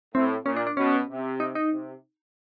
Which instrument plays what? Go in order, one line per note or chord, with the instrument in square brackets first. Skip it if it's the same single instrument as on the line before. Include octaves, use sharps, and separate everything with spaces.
[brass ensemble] A2 [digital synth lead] C4
[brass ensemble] A#2 [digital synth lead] C#4
[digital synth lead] D4
D4
[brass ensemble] B2 [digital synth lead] C#4
[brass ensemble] C3
[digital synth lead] D#4
D#4
[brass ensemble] C3